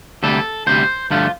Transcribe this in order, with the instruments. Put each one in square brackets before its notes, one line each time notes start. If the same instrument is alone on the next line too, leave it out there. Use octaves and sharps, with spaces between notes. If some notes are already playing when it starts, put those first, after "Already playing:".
[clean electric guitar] D2 C3 G3 A4
D2 C3 G3 C5
G2 D3 F3 A3 F4